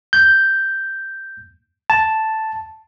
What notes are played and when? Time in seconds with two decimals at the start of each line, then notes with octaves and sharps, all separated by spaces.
0.13 G6
1.90 A5